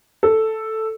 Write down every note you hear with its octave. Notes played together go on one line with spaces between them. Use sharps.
A4